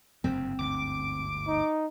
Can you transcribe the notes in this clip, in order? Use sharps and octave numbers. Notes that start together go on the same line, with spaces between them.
F#1 G2 C3 C4
G1 D2 G#2 D6
D#4